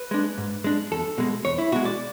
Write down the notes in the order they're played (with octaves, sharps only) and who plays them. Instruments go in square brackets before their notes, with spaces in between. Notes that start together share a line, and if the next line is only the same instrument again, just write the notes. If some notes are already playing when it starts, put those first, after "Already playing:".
Already playing: [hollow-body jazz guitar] B4
G#3 D4
G#2
G#3 D4
E2 A4
B2 G#3
E2 C#5
E4
B2 G#3 F#4
D5